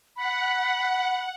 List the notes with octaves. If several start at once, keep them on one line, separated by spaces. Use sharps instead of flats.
F#5 B5